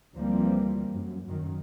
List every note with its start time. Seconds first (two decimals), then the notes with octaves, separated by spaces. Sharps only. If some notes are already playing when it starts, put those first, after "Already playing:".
0.15 D2 E3 F3 G3 A#3 C4
0.90 F#2
1.26 F#2 D#3